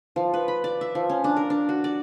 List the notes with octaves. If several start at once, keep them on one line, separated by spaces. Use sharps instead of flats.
F3
B4
B5
D5
E5
F3
C#4
D4
A#4
D4
F#4
D5